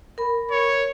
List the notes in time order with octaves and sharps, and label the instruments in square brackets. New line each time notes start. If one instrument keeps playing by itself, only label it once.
[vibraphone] A#4 B5
[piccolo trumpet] C#5